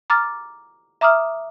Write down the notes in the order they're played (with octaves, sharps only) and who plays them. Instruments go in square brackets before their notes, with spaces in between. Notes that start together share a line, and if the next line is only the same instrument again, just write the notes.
[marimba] A#5 D6 F6 A6
E5 A#5 D6 D#6 F6